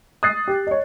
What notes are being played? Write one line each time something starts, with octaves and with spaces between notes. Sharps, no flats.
D#6 F#6 A6 C7
G4
C#5 D#5